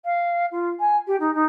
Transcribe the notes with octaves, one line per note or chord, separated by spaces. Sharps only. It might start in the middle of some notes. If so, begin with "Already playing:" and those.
F5
F4
G#5
G4
D#4
D#4